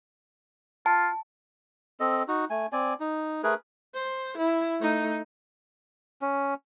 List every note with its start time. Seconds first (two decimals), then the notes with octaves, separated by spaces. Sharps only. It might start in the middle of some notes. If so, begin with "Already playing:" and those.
0.86 F4 A5
2.00 C4 A4 D#5
2.28 D#4 F#4
2.50 A3 G#5
2.73 C4 D5 G#5
3.00 D#4
3.43 A3 G#4 A#4 B4
3.94 C5
4.38 E4
4.80 A3 D#4
6.22 C#4